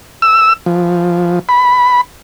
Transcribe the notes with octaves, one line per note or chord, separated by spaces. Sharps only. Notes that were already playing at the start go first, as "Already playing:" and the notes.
E6
F3
B5